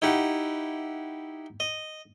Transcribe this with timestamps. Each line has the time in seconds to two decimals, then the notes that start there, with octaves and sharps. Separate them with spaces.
0.02 D#4 E4 G4 F#5
1.60 D#5